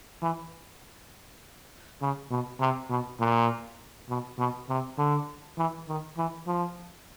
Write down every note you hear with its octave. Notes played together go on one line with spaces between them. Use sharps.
E3
C#3
B2
C3
B2
A#2
B2
B2
C3
D3
E3
D#3
E3
F3